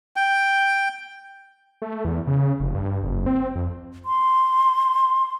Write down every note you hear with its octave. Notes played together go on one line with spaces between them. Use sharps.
G5
A3
E2
C#3
F1
G2
F#1
C4
F2
C6